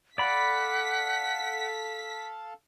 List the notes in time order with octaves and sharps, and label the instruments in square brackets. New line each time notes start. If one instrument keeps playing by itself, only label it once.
[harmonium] A4 F5 A5 [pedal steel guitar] D5 B5 [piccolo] F#5 [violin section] B6